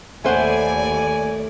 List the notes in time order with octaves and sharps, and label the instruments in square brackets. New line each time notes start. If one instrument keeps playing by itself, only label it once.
[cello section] D#2 D5 [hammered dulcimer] A2 [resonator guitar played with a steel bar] A3 C5 F#5 [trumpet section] G#5